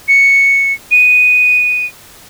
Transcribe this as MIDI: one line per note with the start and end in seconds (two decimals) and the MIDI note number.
0.08 0.73 97
0.91 1.86 99